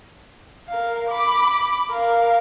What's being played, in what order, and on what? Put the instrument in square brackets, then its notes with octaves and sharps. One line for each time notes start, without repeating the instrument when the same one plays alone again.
[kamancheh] A#4 F5
B5 D6
A#4 F5